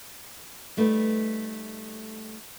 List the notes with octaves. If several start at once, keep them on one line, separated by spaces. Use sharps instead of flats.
G3 A3 D#4 B4